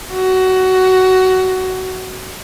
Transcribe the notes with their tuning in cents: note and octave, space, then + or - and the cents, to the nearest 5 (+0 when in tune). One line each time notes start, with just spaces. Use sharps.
F#4 +15